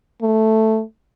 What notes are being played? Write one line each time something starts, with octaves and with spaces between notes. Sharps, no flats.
A3